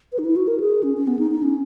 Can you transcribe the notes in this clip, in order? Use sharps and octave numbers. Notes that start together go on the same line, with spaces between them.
B4
D#4
E4
F#4
A#4
G#4
C#4
C#4
B3
D#4
D#4
C#4